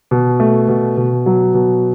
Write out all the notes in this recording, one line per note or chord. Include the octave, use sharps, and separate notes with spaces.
B2
A3
B2
B2
F#3
B2